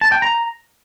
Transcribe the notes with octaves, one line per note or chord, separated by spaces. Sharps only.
A5
G5
A#5